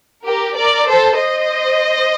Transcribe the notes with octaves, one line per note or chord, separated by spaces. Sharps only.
G4 A#4
A#4 D5
A4 C5
C5 D#5